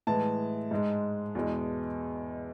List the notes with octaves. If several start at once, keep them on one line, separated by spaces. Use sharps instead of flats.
A2 E3 G#3 A5
G#2 G#3
E2 B2 G#3